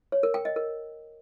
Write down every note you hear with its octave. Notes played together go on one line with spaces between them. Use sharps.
C#5
A#4
G5
D#5
A#4